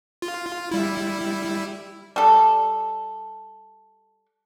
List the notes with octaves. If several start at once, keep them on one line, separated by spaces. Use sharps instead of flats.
F4
G3 E4
G3 A4